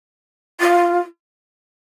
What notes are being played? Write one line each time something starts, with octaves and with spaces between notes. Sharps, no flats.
F4